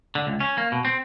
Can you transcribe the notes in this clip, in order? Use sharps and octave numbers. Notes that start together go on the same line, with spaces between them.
D3
C#2
C#4
A#3
B2
C4